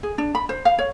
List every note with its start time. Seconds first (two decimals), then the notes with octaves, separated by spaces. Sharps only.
0.03 G#4
0.18 D4
0.35 B5
0.49 C5
0.65 F5
0.79 C#5